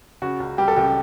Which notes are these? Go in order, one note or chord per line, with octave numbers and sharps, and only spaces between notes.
C#3 F#4
C#2
G3 G4
A4
C#2 G4